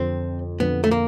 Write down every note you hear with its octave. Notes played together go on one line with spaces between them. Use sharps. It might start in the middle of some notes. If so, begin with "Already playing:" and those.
Already playing: F2 D3 F3 C4
F2 D3 F3 B3
A3
A#3